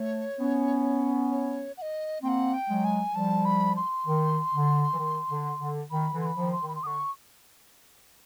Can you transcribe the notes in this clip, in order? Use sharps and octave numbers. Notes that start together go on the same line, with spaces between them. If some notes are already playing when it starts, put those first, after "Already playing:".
Already playing: A3 C#5
B3 C#4
C#5
F#5
D#5
A#3 C4 G5
F#5
G5
F#3 G#3
G#5
F3 G3 A5
B5
C6
D#3
D3
E3
D#3
D3
D3
D#3 B5
D3 E3
C6
B5
D#3 F3
C6
D#3
B5
C6
D3 C#6 D#6